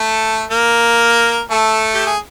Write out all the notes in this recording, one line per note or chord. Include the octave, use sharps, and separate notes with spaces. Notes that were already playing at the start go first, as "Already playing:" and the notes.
Already playing: A3 A4
A#3 A#4
A3 A4
G4
G#4